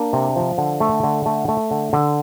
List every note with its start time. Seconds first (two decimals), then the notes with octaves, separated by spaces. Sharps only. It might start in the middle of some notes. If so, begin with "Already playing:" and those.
Already playing: A#3 D4
0.13 C3
0.36 F3
0.58 D3
0.80 A3
1.03 D3
1.26 A3
1.48 A3
1.71 D3
1.93 D3